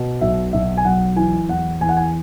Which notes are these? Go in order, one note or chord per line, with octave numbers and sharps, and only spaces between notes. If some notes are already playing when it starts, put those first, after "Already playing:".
Already playing: B2
B1 E5
B1 E5
G#5
F#3 F#5
E3 G#5
E2 F#5
E2 G#5
F#5
G#5